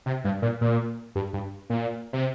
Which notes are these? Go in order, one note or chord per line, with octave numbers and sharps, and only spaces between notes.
C3
G2
A#2
A#2
G2
G2
A#2
C3